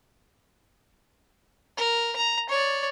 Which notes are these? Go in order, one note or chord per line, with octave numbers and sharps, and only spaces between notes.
A#4
A#5
C#5 D5